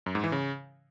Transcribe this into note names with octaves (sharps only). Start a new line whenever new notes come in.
F#2
G#2
E3
C#3